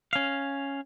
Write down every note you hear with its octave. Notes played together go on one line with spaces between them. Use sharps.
C#4 F5